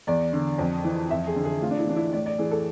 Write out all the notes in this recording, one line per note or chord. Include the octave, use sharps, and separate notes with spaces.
E2 D5
D3
F2
E3
F2 E5
G#4
D3
G#4
A2 F4
D4
E4
E3 D4
E4
A2 D5
D5
E3 G#4
A4